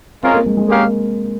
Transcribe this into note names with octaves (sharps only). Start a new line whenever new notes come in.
G#3 C4 C#4 F4 A#4
A#3
G#3
G#3
G#3 A#3 C#4 G4 A#4 F5